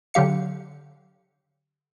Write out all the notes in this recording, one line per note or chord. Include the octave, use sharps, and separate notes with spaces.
D3 F#3 G4 F5 C#7